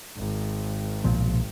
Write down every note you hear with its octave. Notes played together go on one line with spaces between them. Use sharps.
G#1
B1 A#2 F3